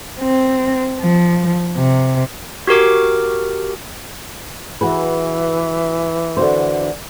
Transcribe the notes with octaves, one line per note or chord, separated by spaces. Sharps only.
C4
F3
C3
F#4 G4 A#4 D6
E3 F#4 G#4 B4
D3 F#4 C5